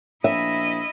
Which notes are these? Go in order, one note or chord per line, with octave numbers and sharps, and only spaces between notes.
A#1 E4 D#5 E5